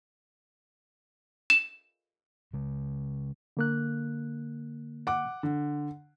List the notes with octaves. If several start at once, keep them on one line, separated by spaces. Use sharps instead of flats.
E7
C#3 G#3
D3 A#3 F#6
F#5 D6
D3